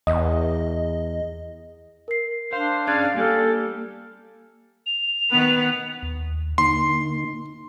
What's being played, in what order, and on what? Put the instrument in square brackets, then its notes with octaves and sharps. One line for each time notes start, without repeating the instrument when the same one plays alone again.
[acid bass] E2 [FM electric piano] D#5
[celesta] A#4 C7
[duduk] D4 [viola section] C5 [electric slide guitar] F5
[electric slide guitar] C#4 G#4 D5 [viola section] F5 [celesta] F#6 G#6 A6
[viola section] G3 [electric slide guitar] A#3 [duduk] A4 [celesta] G#5 F6
[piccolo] F7
[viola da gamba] D#3 B3 B4
[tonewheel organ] D#2
[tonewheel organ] D3 A#3 D#4 [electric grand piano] C6